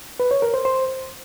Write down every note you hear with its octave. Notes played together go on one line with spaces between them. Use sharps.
B4
C#5
A#4
C5
C5